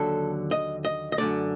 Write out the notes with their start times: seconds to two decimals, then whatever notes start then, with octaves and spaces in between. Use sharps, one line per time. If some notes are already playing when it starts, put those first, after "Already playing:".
Already playing: D#2 D3 F#3 A4
0.51 D#5
0.85 D#5
1.12 D#5
1.18 F#2 D3 A3 D5